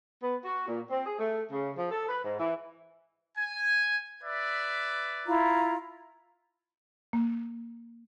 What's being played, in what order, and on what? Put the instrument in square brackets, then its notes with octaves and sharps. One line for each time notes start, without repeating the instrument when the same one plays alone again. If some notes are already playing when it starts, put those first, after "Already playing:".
[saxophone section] B3
F#4
A#2
C4
G#4
A3
C#3
F3
A4
B4
G#2
E3
[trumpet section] G#5
B4 D5 E5
[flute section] E4 F4 A#5
[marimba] A#3